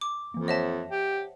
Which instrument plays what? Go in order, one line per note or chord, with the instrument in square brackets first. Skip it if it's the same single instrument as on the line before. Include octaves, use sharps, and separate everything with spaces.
[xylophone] D6
[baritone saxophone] F2 [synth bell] E3 A#3
[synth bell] C5 C#5 F#5 [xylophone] D#5 E5 A5
[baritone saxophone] G4